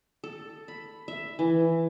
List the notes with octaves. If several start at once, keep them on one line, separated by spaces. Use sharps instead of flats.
A4
B5
E5
E3